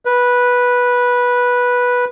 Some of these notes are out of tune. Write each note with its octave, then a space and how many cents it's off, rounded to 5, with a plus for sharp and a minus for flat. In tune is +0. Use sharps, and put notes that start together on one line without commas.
B4 -10